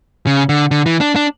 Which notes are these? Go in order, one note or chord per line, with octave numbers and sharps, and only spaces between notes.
C#3
D3
D3
E3
D4
D4